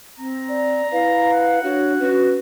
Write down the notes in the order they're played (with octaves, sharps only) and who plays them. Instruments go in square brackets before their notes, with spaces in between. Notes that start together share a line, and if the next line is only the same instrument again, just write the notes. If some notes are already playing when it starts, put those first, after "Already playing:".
[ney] C4 [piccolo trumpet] A#5
[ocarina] D5
[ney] E4 [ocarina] B4 [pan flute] F5
[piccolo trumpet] F#5
[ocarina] D4 [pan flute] F#4 [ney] C#5
[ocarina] C#4 [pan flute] F#4 [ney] B4